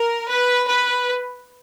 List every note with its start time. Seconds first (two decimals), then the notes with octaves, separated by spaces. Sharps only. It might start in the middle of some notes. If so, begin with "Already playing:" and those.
Already playing: A#4
0.29 B4
0.68 B4